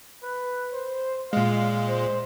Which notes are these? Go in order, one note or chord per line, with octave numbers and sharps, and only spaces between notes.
B4
C5
A#2 G#3 F5
C5